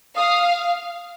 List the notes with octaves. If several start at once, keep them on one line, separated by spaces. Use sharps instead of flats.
F5 D#6